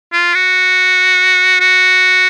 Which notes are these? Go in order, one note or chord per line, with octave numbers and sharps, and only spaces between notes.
F4
F#4
F#4